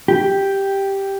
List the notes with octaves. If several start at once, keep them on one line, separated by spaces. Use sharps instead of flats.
G4